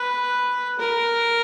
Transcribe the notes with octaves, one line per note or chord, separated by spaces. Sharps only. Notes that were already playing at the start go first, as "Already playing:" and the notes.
Already playing: B4
A#4